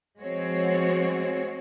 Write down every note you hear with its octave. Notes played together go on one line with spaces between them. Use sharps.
F3 G#3 C4 F#4 C#5